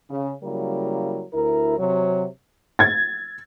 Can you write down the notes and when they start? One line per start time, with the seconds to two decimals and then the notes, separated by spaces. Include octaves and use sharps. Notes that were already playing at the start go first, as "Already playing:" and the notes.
0.10 C#3
0.43 C#3 F#3 G3 A#3 E4 A#4
1.34 D2 E4 A#4
1.78 C3 F#3 C#5
2.79 G#6 A6